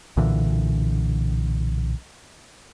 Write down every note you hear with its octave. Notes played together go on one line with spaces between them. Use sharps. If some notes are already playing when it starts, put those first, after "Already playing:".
B1 A#2 D3 E3